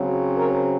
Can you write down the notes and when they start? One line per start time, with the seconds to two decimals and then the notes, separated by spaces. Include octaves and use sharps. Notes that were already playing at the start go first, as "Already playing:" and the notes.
Already playing: C#3 F#3 C4
0.38 A#4 C#5